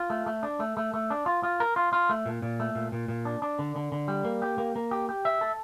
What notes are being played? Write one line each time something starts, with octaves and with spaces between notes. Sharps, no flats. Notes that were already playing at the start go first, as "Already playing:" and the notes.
Already playing: F4
A3
A3
D4
A3
A3
A3
D4
F4
F4
A#4
F4
F4
A3
A#2
A#2
A3
A#2
A#2
A#2
D4
D4
D3
D3
D3
G3
A#3
G4
A#3
A#3
G4
G4
E5
A4